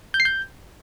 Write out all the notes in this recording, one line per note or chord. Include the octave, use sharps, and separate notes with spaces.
G6
C7
G6